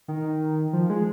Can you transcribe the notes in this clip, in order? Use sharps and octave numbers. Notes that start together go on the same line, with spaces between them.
D#3
F3
G#3